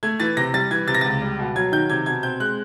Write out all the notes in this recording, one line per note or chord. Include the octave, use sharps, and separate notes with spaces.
A3 G#6
E3 A6
C3 A#6
G3 A6
E3 G#6
C3 A6
A#6
C#2 A6
G3
B2
F#3 G#6
D#3 G6
C3 G#6
B2 G#6
C4 G6
G#3 F#6